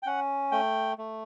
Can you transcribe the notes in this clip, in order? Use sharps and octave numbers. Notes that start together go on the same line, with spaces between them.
G5
C#4 F#5
A3 G5
A3